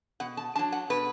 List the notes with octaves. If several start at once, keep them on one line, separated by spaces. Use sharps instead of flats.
B2 F#5
A5
F#3 D4 A5
F#5
B2 B4